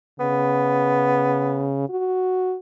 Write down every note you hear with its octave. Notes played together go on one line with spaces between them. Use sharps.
C#3 B3
F#4